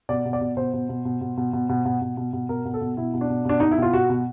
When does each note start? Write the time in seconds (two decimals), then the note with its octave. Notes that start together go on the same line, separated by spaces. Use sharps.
0.09 B2 D5
0.25 B2
0.33 D5
0.41 B2
0.57 B2 C5
0.73 B2
0.89 B2
1.05 B2
1.21 B2
1.37 B2
1.53 B2
1.69 B2
1.85 B2
2.01 B2
2.17 B2
2.33 B2
2.49 B2 A#4
2.65 B2
2.74 A4
2.81 B2
2.97 B2 E4
3.14 B2
3.21 D4
3.30 B2
3.45 B2 D4
3.60 B2 D#4
3.71 E4
3.78 B2 F4
3.93 B2 F#4
4.10 B2